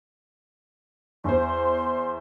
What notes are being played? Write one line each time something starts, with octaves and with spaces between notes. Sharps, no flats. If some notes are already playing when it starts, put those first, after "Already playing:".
E2 C5 C6